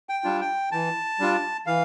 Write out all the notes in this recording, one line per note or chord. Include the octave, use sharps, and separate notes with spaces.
G5
G3 D4 F4
G5
E3 A5
G3 D4 F4
E3 F5